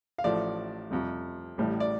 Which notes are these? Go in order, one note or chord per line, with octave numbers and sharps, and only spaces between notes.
F5
A1 A2 F3 A3 D5
F2 C3 G3
A1 A2 G3
D5